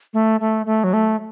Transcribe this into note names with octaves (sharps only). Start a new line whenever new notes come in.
A3
A3
A3
F#3
A3